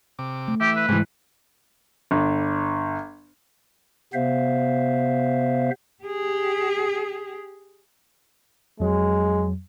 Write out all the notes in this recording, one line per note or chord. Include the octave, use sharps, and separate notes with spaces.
C3 D6
A3
E3 G4 E5
B4
G#2 C3 E3 G#4
G1
C3 B3 C5 E5 F5
G4 G#4
F2 F#3 G#3